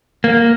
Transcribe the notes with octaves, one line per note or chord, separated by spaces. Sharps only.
A#3